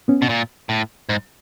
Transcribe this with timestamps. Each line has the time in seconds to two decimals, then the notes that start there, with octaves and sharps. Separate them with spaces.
0.08 B3 C#4
0.22 B2
0.29 A#2
0.69 A2
1.09 G#2